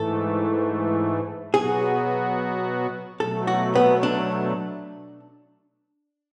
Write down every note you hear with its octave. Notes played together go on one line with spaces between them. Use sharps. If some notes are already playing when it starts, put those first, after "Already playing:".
Already playing: G#2 E3 A3 A4
B2 F#3 B3 F#4 G#4
B2 F#3 A3 A4
F#4
B3
D4